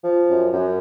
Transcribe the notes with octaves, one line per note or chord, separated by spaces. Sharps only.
F3
F#2
F#2